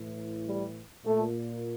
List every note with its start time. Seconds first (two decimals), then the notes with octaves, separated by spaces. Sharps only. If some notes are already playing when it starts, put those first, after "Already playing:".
Already playing: A2 E3
0.47 G3
1.05 A#2 A3